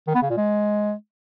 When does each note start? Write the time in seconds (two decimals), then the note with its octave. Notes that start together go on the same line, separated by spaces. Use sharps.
0.07 D#3
0.15 B3
0.22 C#3
0.30 A#2
0.37 G#3